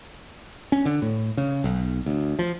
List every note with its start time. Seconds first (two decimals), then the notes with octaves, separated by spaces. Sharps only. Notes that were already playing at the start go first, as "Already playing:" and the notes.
0.72 C#4
0.85 D3
1.02 A2
1.37 C#3
1.64 B1
2.06 D2
2.39 F3